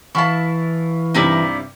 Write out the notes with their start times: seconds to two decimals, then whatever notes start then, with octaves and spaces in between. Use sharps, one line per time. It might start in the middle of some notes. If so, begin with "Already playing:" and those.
0.15 E3 E4 F5 A5 C#6
1.14 G2 C3 D#4 E4 D5